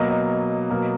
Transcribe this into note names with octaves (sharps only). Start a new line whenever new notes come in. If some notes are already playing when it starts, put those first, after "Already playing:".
Already playing: B2 F#3 A#3 D#5
D#5
B2 F#3 A#3